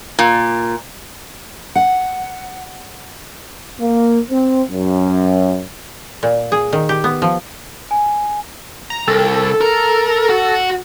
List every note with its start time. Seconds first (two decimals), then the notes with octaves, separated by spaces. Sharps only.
0.19 A#2
1.75 F#5
3.80 A#3
4.30 C4
4.70 F#2
6.23 A#2
6.52 G#4
6.73 D#3
6.89 G4
7.04 B3
7.22 F3
7.91 G#5
8.90 A#5
9.08 C2 A4
9.61 A#4
10.29 F#4